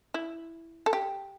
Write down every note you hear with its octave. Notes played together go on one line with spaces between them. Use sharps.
E4
A4
G4